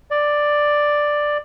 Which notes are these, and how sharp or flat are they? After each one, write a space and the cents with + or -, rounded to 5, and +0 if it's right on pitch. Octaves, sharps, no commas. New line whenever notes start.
D5 +5